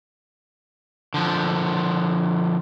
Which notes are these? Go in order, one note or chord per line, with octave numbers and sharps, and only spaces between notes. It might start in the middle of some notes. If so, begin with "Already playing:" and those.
D3 F3